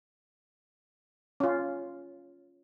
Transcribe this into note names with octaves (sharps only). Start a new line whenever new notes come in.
C#4 F4